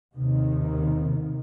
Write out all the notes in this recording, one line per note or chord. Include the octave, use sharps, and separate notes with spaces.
D#2 C3 D#3